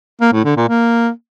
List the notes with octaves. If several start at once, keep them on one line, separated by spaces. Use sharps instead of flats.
A#3
A2
D3
A#2
A#3